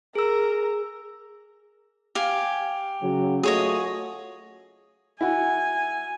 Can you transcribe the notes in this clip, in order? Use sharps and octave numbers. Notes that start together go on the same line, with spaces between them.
G#4 A#4 E6
G4 F5 G#5
C#3 F#3
A3 F4 F#4 G#4 C#5 D#5
E4 F#4 G#5